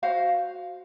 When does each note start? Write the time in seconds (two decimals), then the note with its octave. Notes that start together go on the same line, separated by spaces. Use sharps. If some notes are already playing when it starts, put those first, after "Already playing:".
0.03 F#4 C5 F5